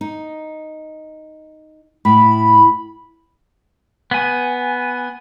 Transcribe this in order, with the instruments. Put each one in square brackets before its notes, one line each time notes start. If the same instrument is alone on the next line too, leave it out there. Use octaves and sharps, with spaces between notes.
[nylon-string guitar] D#4
[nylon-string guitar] A2 [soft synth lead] B5
[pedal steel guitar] B3 G#5